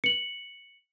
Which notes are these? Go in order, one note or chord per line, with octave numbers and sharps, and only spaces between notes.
C#7 F#7